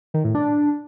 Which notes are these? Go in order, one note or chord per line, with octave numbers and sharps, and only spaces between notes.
D#3
A2
D4